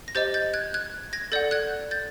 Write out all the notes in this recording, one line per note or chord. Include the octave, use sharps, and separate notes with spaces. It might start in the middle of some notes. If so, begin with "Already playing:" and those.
A#6
G4 C5 D#5 G6 A6
G6 A6
F#6 G#6
F#6 G#6
G#6 A#6
A4 D5 F#5 G6 A6
F#6 G#6
G6 A6